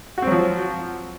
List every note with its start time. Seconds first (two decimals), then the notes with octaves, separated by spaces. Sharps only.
0.18 F#4
0.22 C4
0.27 F#3
0.32 F3